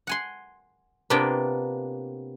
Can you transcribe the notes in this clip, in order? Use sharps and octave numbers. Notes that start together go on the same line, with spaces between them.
F#5 G#5 C6
C3 A#3 B3 D4 F4 G5